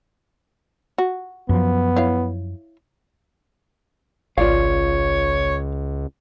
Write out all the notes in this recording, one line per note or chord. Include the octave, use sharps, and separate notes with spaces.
F#4
F#2 F3 B3
E4 C#5 F5
G#1 C#2 F4 C#5 D5 F5